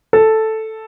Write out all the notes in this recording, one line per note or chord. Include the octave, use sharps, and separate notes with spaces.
A4